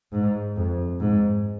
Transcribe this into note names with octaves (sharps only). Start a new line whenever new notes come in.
G#2
F2
G#2